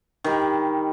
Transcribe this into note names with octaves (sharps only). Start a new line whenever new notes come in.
D#3 G3